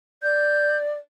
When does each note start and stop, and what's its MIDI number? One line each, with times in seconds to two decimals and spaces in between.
0.23 0.93 74
0.23 0.77 91